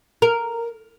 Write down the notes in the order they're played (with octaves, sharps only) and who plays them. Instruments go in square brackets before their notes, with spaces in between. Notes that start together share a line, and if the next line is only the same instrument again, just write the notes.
[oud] A#4